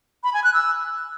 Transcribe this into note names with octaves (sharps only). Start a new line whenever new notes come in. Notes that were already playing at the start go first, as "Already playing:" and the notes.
B5
G#5
F#6
E6